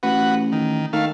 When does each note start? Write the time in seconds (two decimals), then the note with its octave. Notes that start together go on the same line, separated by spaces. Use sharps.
0.03 A1 F#4 B4
0.52 D#3
0.93 D#3 A3 F5